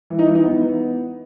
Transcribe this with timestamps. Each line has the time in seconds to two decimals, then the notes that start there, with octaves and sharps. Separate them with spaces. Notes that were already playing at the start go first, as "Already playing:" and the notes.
0.10 E3
0.19 D#4
0.27 E3
0.35 D#4
0.43 B3